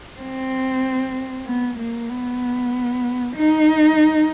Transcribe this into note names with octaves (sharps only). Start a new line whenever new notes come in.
C4
B3
A#3
B3
D#4